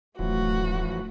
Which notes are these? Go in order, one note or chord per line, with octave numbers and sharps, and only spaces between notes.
D1 F#2 E3 F3 A3 F#4